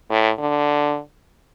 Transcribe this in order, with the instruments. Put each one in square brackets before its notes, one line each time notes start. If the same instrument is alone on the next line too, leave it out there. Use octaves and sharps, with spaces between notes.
[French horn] A2
D3